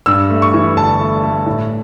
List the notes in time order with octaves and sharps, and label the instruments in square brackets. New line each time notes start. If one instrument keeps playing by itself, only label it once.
[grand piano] G2 E6
A3
C#6
E3
G1 A5
A3
A3
A2